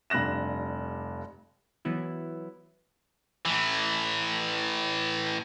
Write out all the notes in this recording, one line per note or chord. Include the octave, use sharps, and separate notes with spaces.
F1 G2 F#6 A#6 E7
E3 F#3 B3 E4
A2 E3